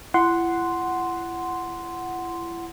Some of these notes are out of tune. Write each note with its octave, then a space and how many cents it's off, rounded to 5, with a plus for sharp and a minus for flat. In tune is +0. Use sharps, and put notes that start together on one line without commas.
E4 +40 F#5 +0 C6 -5